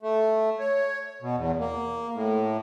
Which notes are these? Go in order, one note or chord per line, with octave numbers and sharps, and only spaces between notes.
A3
C#5
B2
E2
A#3
A2